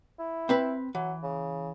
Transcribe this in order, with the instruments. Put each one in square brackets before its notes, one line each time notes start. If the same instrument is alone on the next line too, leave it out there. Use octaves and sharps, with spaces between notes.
[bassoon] E4
[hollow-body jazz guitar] C4 B4 B5
[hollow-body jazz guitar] E3 [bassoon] F#3
[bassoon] C#3